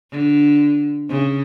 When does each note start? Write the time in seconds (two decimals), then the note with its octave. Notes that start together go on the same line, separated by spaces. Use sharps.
0.11 D3
1.09 C#3